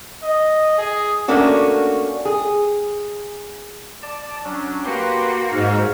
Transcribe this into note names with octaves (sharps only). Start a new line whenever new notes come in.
D#5
G#4
A3 A#3 C#4 D4 F#4
G#4
D5 A5
F#3 C#4 D4
A#3 F#4 G4 B4 C6
G#2 C#5 F5